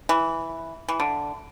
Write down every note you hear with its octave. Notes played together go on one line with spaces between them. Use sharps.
E3
E3
D3